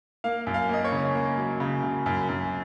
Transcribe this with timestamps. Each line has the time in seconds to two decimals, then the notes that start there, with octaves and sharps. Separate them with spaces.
0.24 A#3 F5
0.47 F#2
0.54 F5
0.69 A#3 D#5
0.84 C#5
0.92 C#3
1.15 A#3
1.37 F#3
1.60 C#3
1.83 C#3
2.06 F#2
2.29 F#2